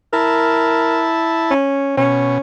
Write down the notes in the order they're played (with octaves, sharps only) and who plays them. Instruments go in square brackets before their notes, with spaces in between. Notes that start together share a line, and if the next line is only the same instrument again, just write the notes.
[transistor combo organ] E4 A5 [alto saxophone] A#4
[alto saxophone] C#4
[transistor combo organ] B2 [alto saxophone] C#4